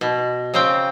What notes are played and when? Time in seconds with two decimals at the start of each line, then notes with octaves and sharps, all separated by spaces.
0.01 B2
0.54 C#3 C4 G5